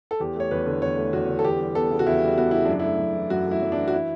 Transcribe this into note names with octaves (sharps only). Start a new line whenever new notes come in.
A4
E2 G4
A3 C#5
E2 B4
D3
E2 C#5
A3
E2 F#4
D3
A4
E2 G4
G3
B3 A4
C#3
F#4
E2 E4
G3
B3 F#4
C#3 E4
F#2 D4
A3 E4
F#2
E3
F#2 F#4
A3 E4
F#2
D4
E3
F#4
E4